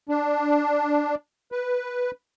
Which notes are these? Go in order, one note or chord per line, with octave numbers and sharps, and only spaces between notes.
D4
B4